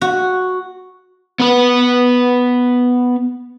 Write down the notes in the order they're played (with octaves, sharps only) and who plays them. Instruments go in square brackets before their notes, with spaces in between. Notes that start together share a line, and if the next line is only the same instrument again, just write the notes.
[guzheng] F#4
[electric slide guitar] B3 B4